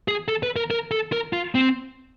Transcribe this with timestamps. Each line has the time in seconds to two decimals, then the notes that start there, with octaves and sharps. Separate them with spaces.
0.08 G#4
0.28 A4
0.43 B4
0.56 A#4
0.71 A#4
0.91 A4
1.12 A#4
1.33 F4
1.55 C4